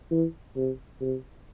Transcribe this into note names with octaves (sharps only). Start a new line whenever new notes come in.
E3
C3
C3